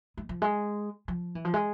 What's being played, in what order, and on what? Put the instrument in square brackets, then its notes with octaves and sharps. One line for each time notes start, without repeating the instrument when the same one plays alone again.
[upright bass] G#3
F3
G#3
F3
E3
F3
G#3